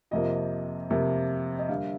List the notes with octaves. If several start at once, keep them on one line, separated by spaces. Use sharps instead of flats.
F2 C3 F3 A#3 D#5
F2 C3 F3 A#3
D#5
D3 G3 A#3 F5